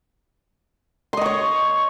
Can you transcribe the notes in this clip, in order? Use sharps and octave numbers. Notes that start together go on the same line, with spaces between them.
C#5 D#5 C6 C#6